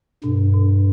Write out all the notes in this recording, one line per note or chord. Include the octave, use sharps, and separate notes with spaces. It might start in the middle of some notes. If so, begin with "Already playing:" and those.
G2 B2
B2